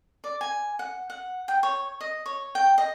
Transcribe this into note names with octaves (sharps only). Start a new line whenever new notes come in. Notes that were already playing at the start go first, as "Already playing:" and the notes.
D5
G#5
F#5
F#5
G5
C#5
D#5
C#5
G5
D#5